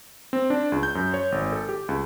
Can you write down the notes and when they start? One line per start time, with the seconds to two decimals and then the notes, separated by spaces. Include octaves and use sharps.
0.33 C4
0.50 D4
0.72 C#2
0.83 G6
0.95 F#2
1.14 C#5
1.32 G#1
1.52 A4
1.69 G4
1.89 C#2